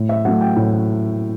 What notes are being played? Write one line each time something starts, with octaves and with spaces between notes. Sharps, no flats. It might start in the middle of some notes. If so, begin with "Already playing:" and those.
Already playing: A2
E5
F#3 A3 F#5
G5
A2